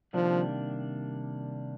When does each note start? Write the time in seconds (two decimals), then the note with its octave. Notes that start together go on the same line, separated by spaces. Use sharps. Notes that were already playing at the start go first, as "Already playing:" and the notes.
0.13 C3 D#3 F3 G3 A#3 D4